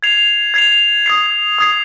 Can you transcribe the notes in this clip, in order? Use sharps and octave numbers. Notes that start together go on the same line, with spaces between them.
G#6 C7 F7
G#6 C7 F7
D#6 G#6 C7
D#6 G#6 C7